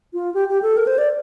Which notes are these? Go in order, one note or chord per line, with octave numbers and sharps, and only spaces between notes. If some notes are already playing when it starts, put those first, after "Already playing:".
F4
G4
G4
A4
A#4
C5
D5